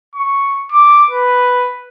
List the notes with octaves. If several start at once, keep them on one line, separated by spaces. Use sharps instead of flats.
C#6
D6
B4